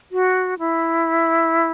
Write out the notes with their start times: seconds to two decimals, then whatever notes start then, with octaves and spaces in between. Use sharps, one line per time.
0.12 F#4
0.59 E4